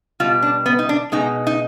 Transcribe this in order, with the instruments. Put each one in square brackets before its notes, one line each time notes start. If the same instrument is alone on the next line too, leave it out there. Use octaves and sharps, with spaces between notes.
[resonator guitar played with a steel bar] B2 G3 F4
D4
B3
D#4
D4
B2 G#3 D#4
D#4